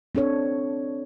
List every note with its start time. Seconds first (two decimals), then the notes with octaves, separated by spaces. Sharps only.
0.15 C4 D4 A4 C#5